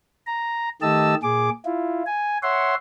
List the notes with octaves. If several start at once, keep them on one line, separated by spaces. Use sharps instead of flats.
A#5
D#3 A3 G4 D#5 A5 E6
A#2 G#4 D6
E4 F4
G#5
C#5 E5 F#5 C6